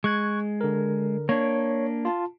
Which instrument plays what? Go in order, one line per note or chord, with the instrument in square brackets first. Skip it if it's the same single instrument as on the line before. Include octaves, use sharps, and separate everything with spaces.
[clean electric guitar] G#3 [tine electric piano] C#6 F#6 G#6
[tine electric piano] D3 A#4
[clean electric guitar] A#3 D4 [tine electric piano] C#5
[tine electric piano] F4 A5